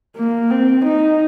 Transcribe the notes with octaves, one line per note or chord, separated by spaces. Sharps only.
A#3
C4
D#4